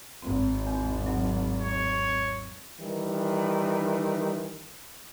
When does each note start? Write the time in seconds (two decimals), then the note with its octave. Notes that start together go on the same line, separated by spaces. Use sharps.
0.22 G#1 C4
0.67 E2
1.06 F#3
1.60 C#5
2.80 D#3 E3 G3